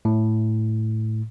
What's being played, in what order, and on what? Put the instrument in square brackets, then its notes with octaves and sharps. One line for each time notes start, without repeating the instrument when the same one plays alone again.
[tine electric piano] A2